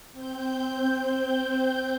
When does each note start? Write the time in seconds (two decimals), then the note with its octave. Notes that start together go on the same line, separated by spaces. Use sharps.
0.12 C4 G6